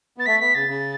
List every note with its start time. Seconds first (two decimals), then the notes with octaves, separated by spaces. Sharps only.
0.17 B3 A6
0.26 A3 B6
0.40 B3 B6
0.55 C#3 A6
0.69 C#3